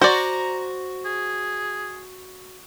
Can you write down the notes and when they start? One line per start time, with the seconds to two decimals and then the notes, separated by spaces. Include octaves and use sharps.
0.01 F#4 C5 D5 A#5
1.05 G#4